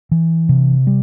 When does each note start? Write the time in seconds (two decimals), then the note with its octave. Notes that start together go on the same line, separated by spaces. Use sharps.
0.11 E3
0.49 C3
0.87 G3